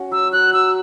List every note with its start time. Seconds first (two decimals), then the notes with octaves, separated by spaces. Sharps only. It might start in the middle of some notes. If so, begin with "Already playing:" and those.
Already playing: C#4 F#4
0.11 F#3 E6
0.32 F#3 F#6
0.53 F#3 E6